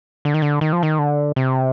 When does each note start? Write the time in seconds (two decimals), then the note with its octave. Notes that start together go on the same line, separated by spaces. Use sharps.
0.25 D3
0.34 D#3
0.42 D3
0.61 D#3
0.73 F3
0.83 D#3
0.99 D3
1.36 C3